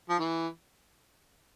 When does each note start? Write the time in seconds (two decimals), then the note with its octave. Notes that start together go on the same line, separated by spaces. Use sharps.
0.09 F3
0.19 E3